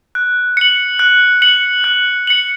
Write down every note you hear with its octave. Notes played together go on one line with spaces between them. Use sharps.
F#6
C#7 F#7
F#6
C#7 F#7
F#6
C#7 F#7